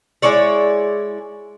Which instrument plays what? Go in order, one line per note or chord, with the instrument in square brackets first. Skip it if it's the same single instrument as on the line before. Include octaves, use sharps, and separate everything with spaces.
[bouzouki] G#3 E4 C#5 D5